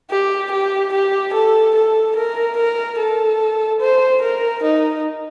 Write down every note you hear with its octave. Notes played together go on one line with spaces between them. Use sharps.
G4
G4
G4
A4
A4
A#4
A#4
A4
C5
A#4
D#4